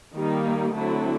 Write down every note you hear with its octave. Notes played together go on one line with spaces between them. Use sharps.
D#3 G3 A#3 D#4
D3 F#3 A3 C4 E4